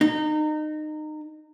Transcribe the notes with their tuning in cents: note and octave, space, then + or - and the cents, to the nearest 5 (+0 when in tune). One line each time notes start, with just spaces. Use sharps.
D#4 -25